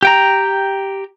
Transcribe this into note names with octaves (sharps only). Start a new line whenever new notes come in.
G4 G5 A#5